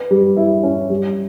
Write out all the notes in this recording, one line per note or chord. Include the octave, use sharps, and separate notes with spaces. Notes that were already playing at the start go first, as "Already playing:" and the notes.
Already playing: B4
G3
E4
C#4
G3